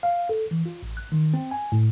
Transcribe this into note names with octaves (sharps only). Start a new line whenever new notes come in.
F5
A4
E3
F4
A1
F#6
D#3
C4
G#5
A2